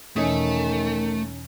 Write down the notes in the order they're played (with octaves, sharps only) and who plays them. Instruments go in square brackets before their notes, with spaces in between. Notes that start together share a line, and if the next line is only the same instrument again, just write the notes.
[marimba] E2 B2 E3 [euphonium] D#3 [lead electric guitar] A3 [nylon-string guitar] C#4 D#4 G#4